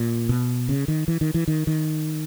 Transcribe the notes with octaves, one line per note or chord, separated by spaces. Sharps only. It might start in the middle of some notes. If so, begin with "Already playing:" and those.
Already playing: A#2
B2
C#3
D#3
E3
D#3
E3
D#3
D#3